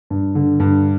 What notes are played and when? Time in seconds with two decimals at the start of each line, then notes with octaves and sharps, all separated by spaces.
0.10 G2
0.35 D3
0.60 G2